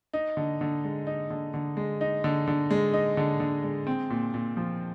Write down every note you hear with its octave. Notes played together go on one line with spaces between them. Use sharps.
D#4
D3
D3
G#3
D#4
D3
D3
G#3
D#4
D3
D3
G#3
D#4
D3
D3
G#3
C4
A#2
A#2
F3